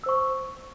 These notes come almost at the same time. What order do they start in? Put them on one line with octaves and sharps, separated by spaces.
E6 C5 C#6